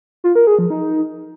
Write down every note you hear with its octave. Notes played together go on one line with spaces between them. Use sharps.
F4
A#4
G#4
F3
D#4